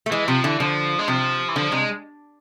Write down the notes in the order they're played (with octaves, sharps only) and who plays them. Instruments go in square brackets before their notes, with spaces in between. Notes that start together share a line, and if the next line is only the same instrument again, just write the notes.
[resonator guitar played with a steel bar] A3
[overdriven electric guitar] E3 [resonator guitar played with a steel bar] G#3
[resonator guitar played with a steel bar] C3 [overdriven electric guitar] F3
[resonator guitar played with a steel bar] D3 [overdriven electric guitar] E3
[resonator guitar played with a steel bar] D3 [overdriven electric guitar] F3
[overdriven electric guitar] G#3
[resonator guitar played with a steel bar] C3 [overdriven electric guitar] F3
[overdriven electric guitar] E3
[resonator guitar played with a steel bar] D3 [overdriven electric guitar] F3
[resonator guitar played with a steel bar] C3 [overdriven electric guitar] G#3